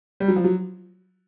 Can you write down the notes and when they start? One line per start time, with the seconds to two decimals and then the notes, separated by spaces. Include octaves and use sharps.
0.20 G3
0.28 F#3
0.36 F3
0.44 F#3